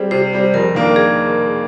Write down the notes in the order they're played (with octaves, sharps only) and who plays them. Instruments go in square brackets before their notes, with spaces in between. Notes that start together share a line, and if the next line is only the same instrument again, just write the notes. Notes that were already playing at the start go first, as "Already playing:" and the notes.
Already playing: [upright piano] G3 C4 [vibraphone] G#4
[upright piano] C3 [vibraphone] C5
[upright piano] G3 C4
[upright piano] F2 [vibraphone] A#4
[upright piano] D#3 A#3 D4
[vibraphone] G#4